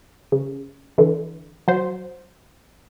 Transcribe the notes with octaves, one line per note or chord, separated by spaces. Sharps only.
C#3
D3 E3
F#3 C5